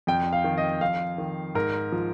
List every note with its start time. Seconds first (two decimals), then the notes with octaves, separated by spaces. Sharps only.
0.07 F2 G5
0.33 F5
0.44 D#3
0.58 D#5
0.81 F2 F5
1.18 D#3
1.55 G#2 A#4
1.92 F3